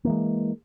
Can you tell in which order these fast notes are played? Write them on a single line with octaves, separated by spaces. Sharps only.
A#3 E3 G#3